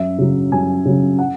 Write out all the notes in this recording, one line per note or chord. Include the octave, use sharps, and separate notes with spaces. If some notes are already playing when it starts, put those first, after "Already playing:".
Already playing: F#2 E5
C#3 F#3
F#2 G#5
C#3 F#3
F#5